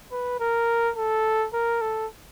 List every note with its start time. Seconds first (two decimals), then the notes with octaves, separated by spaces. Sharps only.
0.12 B4
0.40 A#4
0.96 A4
1.53 A#4
1.81 A4